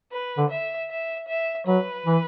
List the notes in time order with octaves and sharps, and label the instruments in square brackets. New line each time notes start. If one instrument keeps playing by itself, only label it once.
[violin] B4
[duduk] D3
[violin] E5
E5
E5
[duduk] F#3 [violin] B4
[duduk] E3